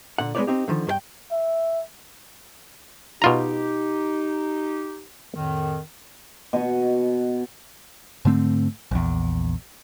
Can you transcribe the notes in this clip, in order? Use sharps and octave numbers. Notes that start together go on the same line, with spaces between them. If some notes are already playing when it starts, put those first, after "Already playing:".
A#2 D3 F#5
G#3 B3 D#4 B4 C#5 D5
C4 D#4 G4
D3 D#3 F3
G2 A#4 G5
E5
B2 D#4 F4 G4 A#5
F2 A2 D#3
B2 D#5 C#6
G#2 D3 A3 C4
A#1 E2